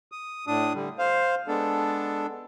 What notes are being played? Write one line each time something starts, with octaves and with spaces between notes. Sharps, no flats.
D#6
A2 D4 D#6
D3 G3
C5 F5
G#3 B3 D4 A4